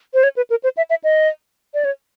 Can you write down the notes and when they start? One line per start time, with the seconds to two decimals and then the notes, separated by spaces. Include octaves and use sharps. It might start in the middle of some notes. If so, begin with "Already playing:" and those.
0.14 C5
0.23 C#5
0.37 B4
0.50 A#4
0.64 C5
0.77 E5
0.90 E5
1.04 D#5
1.74 D5
1.85 C#5